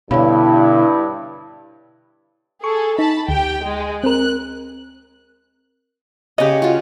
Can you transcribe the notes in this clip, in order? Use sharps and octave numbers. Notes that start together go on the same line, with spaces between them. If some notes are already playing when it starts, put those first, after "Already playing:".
G2 B2 D3 E4 C#5 F5 B5
G#4 A4 C#6
D#4 A5 B5
D2 G4 G5
G#3
C4 A#4 F#6
C#3 G4 C#5 D#5
F4 F#4